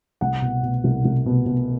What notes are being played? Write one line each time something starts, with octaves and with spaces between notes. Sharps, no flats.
C2 F#5
B2
B2
C2
C2
B2
B2